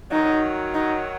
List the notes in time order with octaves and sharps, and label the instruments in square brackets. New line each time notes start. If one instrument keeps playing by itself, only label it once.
[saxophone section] D#3 F#3 [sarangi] D#4
[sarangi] D#4